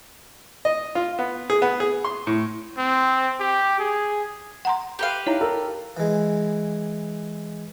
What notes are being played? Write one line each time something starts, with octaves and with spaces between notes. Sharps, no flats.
D#5
F4
B3
G#4
B3
G#4
C6
A2
C4
G4
G#4
F#5 A#5 C6
G4 B4 F5
D#4 E4 C#5 A#5
A4 A#4 A#5
E3 G#3